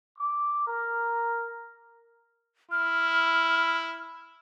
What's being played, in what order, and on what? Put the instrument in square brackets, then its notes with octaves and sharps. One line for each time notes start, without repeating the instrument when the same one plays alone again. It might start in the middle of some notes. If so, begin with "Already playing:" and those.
[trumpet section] D6
A#4
[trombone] E4 [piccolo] F6